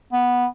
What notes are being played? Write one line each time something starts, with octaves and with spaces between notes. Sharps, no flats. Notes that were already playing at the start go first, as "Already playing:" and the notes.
B3